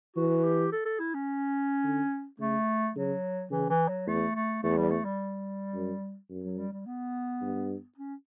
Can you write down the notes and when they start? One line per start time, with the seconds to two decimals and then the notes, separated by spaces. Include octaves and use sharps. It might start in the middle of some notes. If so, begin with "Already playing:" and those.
0.16 E3 F#4
0.44 G4
0.72 A4
0.85 A4
0.99 E4
1.14 C#4
1.84 D3
2.39 C#3 A3
2.95 C#3 F#3
3.50 C#3 E3
3.70 E3
3.88 F#3
4.06 E2 A3
4.35 A3
4.63 E2 A3
4.77 G3
4.91 A3
5.04 G3
5.74 F#2
6.30 F#2
6.44 F#3
6.58 G3
6.73 G3
6.86 B3
7.41 G2
7.97 C#4